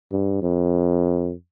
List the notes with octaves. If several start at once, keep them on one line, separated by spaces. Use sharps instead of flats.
G2
F2